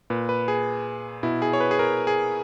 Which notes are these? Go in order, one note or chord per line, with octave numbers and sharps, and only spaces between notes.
A#2 B4
B4
G#4
B2 E4
G#4
C#5
B4
G#4
A#4
G#4